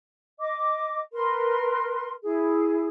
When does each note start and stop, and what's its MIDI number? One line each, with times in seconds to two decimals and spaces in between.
0.39 0.99 75
0.39 0.99 86
1.13 2.12 70
1.13 2.12 71
1.13 2.12 84
2.23 2.89 64
2.23 2.89 68